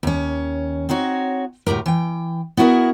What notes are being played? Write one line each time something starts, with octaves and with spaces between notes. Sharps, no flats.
D#2 C#4
C4 D#4 F#4 C#5
D2 A2 F#3 G4 A#4
E3 G5
B3 E4 F#4 G#4 A#4